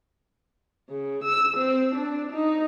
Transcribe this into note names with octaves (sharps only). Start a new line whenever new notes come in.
C#3
E6
C4
D4
D#4